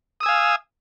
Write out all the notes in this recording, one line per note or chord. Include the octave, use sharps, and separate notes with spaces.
F5 G#5 D#6 E6